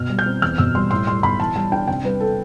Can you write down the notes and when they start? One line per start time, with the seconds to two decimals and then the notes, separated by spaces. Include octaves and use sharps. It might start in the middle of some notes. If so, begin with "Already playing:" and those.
Already playing: B2 F6
0.10 G3
0.19 G6
0.26 C4
0.42 E2 F6
0.58 B2 E6
0.75 G3 C6
0.91 A2 C6
1.07 G3 C6
1.23 B1 B5
1.39 E3 A5
1.56 G3 A5
1.72 D4 G5
1.88 C3 G5
2.04 G3 B4
2.20 A4